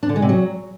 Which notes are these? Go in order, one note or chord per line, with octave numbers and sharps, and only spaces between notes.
D4
D3
G#3
C3
F#3